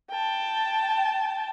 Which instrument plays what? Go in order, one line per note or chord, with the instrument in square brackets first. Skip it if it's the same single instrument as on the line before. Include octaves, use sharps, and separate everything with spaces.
[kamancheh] G5 A5